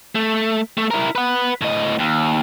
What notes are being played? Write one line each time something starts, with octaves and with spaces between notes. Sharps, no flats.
A3
A3
E4 A#4
B4 F#5
A2 D#5
D#2